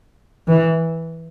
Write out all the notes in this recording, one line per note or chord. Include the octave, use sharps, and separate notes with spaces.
E3